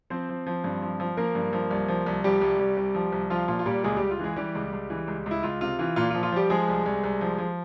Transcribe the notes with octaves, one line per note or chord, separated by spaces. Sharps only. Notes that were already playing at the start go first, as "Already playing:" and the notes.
F3 C4 C5
F3
F3
G2
F3
F3
F3 A#3 A#4
G2
F3
C2
F3
C2
F3 G3 G4
C2
C2
C2
F3
C2
F3 F4
A#2 F4
F4
A#2 G3 G4
C#2 G#3 G#4
C#2 G3 G4
F4
E3 G#3 G#4
E3 G3 G4
C#2
C#2
E3
C#2
C#2 E4
C#2 F4
C3 F4
E3 F4
A#2 F4
F4
F3
F4
F3 G3 G4
F3 G#3 G#4
C2
C2
C2
F3
F3